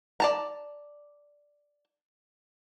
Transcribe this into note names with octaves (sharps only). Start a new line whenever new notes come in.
D5 A5 A#5